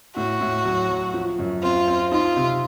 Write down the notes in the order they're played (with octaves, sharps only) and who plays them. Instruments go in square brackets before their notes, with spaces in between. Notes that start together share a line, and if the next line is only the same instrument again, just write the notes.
[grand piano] A2 [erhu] F#4
[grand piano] A2
F#3
F#3
F3
F#2
[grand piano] C4 [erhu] F4
[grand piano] C4
[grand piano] D#4 [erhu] F4
[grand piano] C3